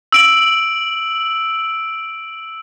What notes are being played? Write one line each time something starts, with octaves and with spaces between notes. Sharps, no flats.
E6 D7 F#7